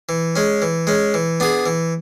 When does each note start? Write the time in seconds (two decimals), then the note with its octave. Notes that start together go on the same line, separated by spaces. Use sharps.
0.09 E3
0.36 G#3 C#4
0.62 E3
0.87 G#3 C#4
1.14 E3
1.40 B3 D4 G#4
1.66 E3